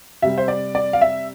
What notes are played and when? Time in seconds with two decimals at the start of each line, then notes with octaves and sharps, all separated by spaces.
0.22 C3 G3 E5
0.38 C5
0.48 D5
0.75 D5
0.93 F5
1.01 E5